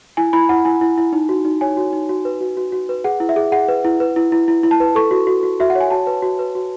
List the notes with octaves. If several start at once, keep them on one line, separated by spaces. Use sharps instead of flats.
E4 G#5
E4 B5
E4 F#5
E4 G#5
E4
E4
D#4
F#4
D#4
C#5 G#5
F#4
D#4
F#4
B4
F#4
F#4
F#4
B4
G#4 F#5
E4
E5
G#4
G#4 F#5
B4
E4
B4
E4
E4
E4
E4
A5
B4
A4 C#6
F#4
F#4
F#4
F#4 E5
F#5
C#5
G#5
F#4 A5
B4
F#4
B4
F#4